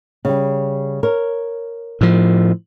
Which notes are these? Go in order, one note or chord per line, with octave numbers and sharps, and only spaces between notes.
C#3 G3
A#4 C#5
A2 F3